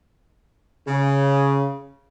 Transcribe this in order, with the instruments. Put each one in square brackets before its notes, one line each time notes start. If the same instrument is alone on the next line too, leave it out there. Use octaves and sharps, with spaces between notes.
[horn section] C#3